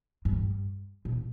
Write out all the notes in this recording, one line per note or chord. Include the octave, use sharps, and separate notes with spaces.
G2
B2